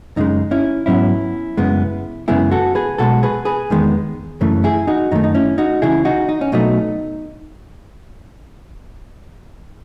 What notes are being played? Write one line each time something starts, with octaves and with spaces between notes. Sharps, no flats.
F#2 C#3 G#3 D#4
C#4 E4
G#2 F#3 B3 C#4 E4
F#2 C#3 G#3 B3
F#2 C#3 G#3 B3 E4 G#4
F#4 A4
G#4 B4
B1 B2 G#3 F#4 A4
G#4 B4
G#4 B4
E2 D#3 G#3 B3
F#2 C#3 E3 A3
E4 G#4
D#4 F#4
F#2 D#3 A3 D#4
D#4
C#4 E4
D#4 F#4
C#2 C#3 E3 E4 G#4
D#4 F#4
D#4
C#4
B1 B2 F#3 A3 D#4